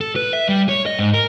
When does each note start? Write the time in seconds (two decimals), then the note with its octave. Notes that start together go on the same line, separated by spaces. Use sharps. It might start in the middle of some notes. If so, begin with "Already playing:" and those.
0.01 A4
0.16 B4
0.33 E5
0.49 G3
0.69 C#5
0.86 D#5
0.99 G#2
1.13 A#4